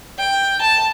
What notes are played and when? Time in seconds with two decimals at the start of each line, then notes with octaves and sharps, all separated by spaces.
0.18 G5
0.61 A5